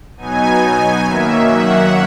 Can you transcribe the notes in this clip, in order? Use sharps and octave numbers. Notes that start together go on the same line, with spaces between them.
B2 F#3 B3 D#4 G#5
G#5
F#2 D#3 F#3 A#3 C#4 E5
F#5